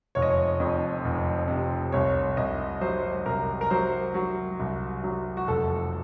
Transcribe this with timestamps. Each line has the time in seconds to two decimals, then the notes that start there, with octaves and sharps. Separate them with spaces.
0.15 F1 C#5
0.22 D#5
0.30 C#5
0.60 F2
1.05 F1
1.48 C3
1.92 C2 C#5
2.37 C2 D#5
2.81 F#3 C5
3.26 C2 A#4
3.61 A#4
3.70 F#3 C5
4.14 F#3
4.59 C2
5.04 F#3
5.37 F#4
5.47 F1 A4